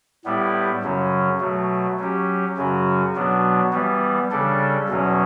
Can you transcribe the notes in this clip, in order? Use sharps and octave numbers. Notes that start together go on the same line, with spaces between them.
A2 G3 B3 E4 G4
F#2 C#3 F#3 C#4
B2 F#3 A3
F#3 C#4 G4
F#2 C#3 F#3 C#4 F#4
B2 F#3 B3 D4
E3 G3 B3
C#3 G3 D4 A4
E2 B2 F#3 C#4